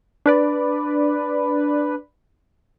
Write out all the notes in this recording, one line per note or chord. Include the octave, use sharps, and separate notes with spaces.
D4 B4 D5